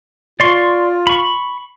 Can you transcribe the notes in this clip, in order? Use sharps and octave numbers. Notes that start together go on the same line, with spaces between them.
F4 D5 C6 C#6
B5 C#6